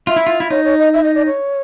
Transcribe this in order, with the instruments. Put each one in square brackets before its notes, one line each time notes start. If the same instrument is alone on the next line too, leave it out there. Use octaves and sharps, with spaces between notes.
[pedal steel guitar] F4 [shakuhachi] E5
[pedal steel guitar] E4
F4
E4
[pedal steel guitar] D#4 [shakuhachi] C#5
[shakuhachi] C#5
D#5
E5
D#5
D5
C#5